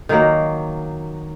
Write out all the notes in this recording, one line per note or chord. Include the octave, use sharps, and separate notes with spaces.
D#3 F#3 A#3